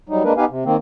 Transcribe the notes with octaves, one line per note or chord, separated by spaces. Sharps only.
F#3 G3 D#4
G#3 A#3 D4 A#4 B4
B3 D#4 G4 B4 F5 G#5
C3
D#3 A#3 C4